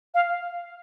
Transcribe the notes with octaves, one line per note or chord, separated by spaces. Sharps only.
F5